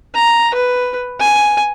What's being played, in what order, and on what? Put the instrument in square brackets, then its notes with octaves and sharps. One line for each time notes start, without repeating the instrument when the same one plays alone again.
[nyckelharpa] A#5
B4
G#5